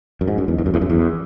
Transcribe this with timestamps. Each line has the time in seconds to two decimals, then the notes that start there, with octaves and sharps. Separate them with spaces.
0.21 F#2
0.28 G#2
0.38 F#2
0.48 E2
0.58 E2
0.66 F#2
0.74 E2
0.81 F#2
0.90 E2